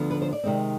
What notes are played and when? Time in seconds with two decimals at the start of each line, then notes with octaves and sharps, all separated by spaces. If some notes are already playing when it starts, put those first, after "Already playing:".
Already playing: D2 D3 F3 B3
0.11 B4
0.22 C5
0.33 D5
0.44 C3 D#3 G#3 C4